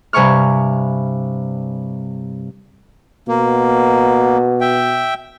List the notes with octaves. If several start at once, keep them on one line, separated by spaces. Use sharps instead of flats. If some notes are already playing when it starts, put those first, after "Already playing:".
G2 C3 G#5 C#6 F6
B2 A#3
E5 G5